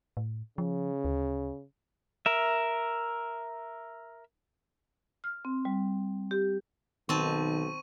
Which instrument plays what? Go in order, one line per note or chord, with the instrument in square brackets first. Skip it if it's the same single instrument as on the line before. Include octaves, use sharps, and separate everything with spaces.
[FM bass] A2
[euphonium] C#3 [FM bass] F3
[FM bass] D2
[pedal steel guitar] A#4 E5
[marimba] F6
C4
G3
G4
[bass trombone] B1 [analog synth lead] D#3 [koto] C4 A5 [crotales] C#6 D#7